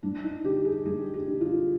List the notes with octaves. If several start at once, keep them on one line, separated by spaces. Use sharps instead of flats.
G2 D4
D#4
D3 G4
G#4
G2 G#4
G4
D3
F4